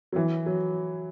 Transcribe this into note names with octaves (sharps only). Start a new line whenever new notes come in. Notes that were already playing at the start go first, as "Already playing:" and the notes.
F#3
E3
F#3